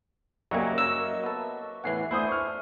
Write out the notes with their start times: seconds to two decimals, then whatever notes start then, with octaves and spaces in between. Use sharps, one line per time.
0.51 C#3 F#3 G3 A#3 D#5 E5 G#5 C#6
0.78 F#2 A#4 E6
1.23 B3 A4
1.84 E2 A2 E3 F#5 G#5 C7
2.11 A3 D4 E4 C5 E5 G#5 D#6
2.28 C#6 F6